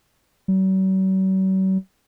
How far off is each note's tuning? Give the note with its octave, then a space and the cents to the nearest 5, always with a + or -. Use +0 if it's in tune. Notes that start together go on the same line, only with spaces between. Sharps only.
F#3 +45